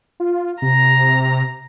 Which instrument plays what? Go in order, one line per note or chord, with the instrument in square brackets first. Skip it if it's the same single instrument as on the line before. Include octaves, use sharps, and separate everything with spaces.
[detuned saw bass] F4
[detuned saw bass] C3 [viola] A#5